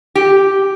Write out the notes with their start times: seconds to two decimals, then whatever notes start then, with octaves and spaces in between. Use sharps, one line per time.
0.15 G4